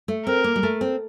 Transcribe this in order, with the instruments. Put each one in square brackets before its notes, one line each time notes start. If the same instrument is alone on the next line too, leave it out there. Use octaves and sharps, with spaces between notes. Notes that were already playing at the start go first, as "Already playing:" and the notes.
[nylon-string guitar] A3
[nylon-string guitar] C4 [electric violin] A#4
[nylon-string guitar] A#3
G3
A3
C4